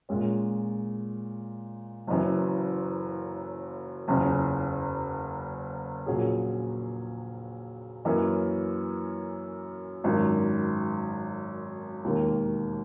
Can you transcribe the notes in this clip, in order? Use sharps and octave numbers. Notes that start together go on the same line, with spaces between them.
A#2 G#3 C#4
F#1 F#2 E3
F#1 E2 C#3
A#1 A#2 F#3 C#4 G#4
F#2 E3 A#3 C#4
G#1 F#2 D#3
E1 D#2 D#3 A#3